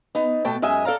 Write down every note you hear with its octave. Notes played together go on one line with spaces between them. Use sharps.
B3 D#4
B2 A3 G5 A5
F#2 G#3 D#5 E5 G#5
A4 D5 F5 A#5